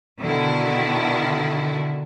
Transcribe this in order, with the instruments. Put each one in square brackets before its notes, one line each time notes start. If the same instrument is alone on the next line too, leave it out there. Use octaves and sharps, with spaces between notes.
[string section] B2 D3 D#3 E4